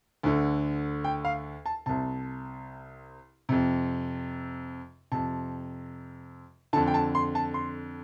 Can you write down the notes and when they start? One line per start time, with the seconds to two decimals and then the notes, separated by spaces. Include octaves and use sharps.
0.23 D2 D3
1.04 G5
1.25 F5
1.66 A5
1.86 C2 C3 A5
3.49 F2 C3
5.12 F2 C3 A5
6.73 D3 A5
6.76 F2
6.87 G5
6.94 A5
7.15 C6
7.35 A5
7.54 C6